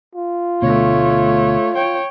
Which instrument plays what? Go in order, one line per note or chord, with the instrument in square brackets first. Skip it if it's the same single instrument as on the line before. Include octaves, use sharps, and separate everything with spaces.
[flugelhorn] F4
[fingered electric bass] D2 B2 [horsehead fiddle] A3 C#5
[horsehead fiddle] C#5 G5